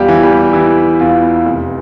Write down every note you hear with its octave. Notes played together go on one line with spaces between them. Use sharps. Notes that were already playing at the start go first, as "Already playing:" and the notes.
Already playing: E2 G3 F4 G4
E3
G3 G4
E3 E4
E2 F4
F1